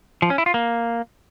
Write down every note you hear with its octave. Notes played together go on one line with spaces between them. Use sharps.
F3
C#4
E4
F4
A#3